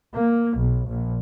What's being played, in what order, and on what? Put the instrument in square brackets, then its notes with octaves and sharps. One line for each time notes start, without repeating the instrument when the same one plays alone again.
[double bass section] A#3
B1
A#1